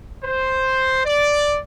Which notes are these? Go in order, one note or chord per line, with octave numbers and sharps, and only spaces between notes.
C5
D5